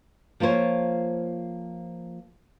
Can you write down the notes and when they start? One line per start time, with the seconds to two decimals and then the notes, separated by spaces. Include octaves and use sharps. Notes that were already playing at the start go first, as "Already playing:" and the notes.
0.40 F3 A#3 F4 C5 C#5